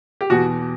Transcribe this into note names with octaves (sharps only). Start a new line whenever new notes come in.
G4
E2 B2 F#4